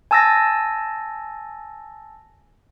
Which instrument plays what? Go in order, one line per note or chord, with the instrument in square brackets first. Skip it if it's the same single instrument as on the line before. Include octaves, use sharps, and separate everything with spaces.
[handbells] G#5 A5 E6 A6 A#6